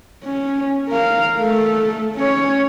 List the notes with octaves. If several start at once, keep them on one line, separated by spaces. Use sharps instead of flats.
C#4
A#4 F5
A3 A4
C#4 C#5